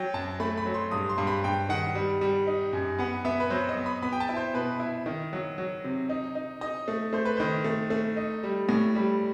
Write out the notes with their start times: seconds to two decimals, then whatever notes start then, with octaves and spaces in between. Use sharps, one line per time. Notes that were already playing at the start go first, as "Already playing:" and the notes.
Already playing: F#3 G5
0.14 F#2 A5
0.40 A3 B5
0.57 B5
0.66 F#3
0.74 C6
0.91 G2 D#6
1.09 C6
1.18 G2
1.27 B5
1.44 G2 G5
1.69 D#3 F#5
1.95 G3
2.21 G3
2.47 D#4
2.73 F#2
2.98 B3 F#5
3.25 B3 E5
3.40 B4
3.50 F#3 C5
3.69 D#5
3.77 B3
3.86 B5
4.02 B3 B5
4.13 G5
4.20 A5
4.29 E4
4.37 C5
4.54 B2 B4
4.80 E4
5.06 D#3
5.33 F#3
5.58 F#3
5.84 C3
6.09 D#4
6.35 D#4
6.61 D#4 D#5
6.88 A3
7.13 A3 C5
7.25 B4
7.37 D#3 C5
7.64 A3
7.90 A3
8.17 D#4
8.43 G3
8.69 A2
8.95 G3